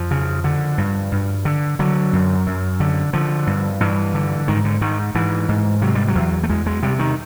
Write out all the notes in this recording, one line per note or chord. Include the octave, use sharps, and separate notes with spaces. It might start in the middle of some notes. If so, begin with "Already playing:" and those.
Already playing: F2 F3
C#3
D3
G2
G2
D3
D3 F#3
F#2
F#2
D3
D3 F3
G2
G2 E3
D3
G#2 D#3
D3
G#2 D#3
G#2 E3
G#2
C3 F#3
G3
F#3
E2
A3
E2 G#3
G#3
C3 G3
D#3